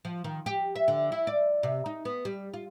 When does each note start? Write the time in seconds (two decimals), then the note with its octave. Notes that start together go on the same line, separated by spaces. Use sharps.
0.05 F3
0.24 D#3
0.46 G4
0.76 E5
0.88 D3
1.12 E4
1.27 D5
1.63 C3
1.86 D#4
2.05 B3
2.25 G3
2.54 F4